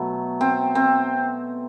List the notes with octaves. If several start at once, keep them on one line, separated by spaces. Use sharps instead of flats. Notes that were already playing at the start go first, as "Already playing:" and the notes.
Already playing: B2 F#3 A3
C4
C4